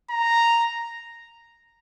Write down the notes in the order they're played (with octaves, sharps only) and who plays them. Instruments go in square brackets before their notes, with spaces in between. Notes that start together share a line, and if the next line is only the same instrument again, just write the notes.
[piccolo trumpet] A#5